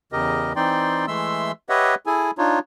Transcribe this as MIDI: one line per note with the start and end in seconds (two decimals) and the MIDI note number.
0.12 0.53 40
0.12 0.53 49
0.12 0.53 67
0.12 0.53 70
0.12 0.53 75
0.56 1.06 52
0.56 1.06 60
0.56 1.06 63
0.56 1.06 74
0.56 1.06 79
0.56 1.06 84
1.08 1.52 52
1.08 1.52 56
1.08 1.52 57
1.08 1.52 76
1.08 1.52 84
1.08 1.52 88
1.69 1.95 67
1.69 1.95 71
1.69 1.95 73
1.69 1.95 75
1.69 1.95 76
1.69 1.95 78
2.06 2.31 64
2.06 2.31 68
2.06 2.31 69
2.06 2.31 80
2.38 2.59 62
2.38 2.59 63
2.38 2.59 65
2.38 2.59 73